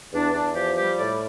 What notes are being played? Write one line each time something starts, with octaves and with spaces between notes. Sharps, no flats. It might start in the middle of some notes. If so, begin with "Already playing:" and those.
E2 D4
E2 D4
F3 G4
G3 G4
A2 D5